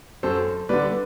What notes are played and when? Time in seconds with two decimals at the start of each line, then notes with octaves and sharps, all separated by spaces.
0.23 F#2 A4 C5
0.69 D3 G3 B4 D5